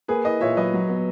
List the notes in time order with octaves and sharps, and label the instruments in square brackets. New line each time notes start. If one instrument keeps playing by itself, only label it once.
[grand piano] A#3 [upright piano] G#4 B4
[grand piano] E4 [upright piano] B4 D#5
[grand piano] A#2 [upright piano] C#5 E5
[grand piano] F#3 [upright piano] B4 D#5
[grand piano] F#3
B3